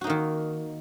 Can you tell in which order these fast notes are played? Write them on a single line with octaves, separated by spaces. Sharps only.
F#4 D#4 A#3 D#3